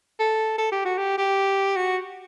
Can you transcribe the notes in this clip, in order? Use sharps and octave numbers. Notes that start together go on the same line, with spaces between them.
A4
A4
G4
F#4
G4
G4
F#4